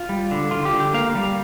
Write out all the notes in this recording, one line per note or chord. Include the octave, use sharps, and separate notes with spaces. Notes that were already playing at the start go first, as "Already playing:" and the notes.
Already playing: F4
G3
D3
D3 F4
G4
D3
G4
A#3 F5
G3